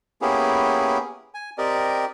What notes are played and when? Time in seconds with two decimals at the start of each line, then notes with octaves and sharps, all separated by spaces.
0.22 A#3 B3 C#4 E4 G4 G#4
1.34 G#5
1.58 C4 G4 A#4 D5 D#5